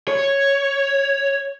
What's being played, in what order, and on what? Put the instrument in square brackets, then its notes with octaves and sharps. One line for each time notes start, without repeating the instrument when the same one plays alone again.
[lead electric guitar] C#5